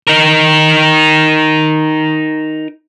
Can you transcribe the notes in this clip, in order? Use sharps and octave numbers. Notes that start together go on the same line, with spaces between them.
D#4 A#4